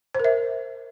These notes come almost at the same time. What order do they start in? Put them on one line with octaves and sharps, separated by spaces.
C5 A#4 E5